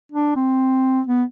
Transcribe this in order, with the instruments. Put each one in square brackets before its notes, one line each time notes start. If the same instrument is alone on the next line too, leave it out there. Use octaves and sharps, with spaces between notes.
[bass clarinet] D4
C4
B3